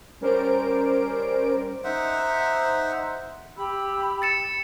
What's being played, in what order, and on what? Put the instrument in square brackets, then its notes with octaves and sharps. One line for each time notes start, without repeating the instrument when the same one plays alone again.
[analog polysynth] G3 C#4 A#4 C5 D5 D7
[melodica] D#4 C5 E5 F#5
[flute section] G4 B5 E6
[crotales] A6 C#7 E7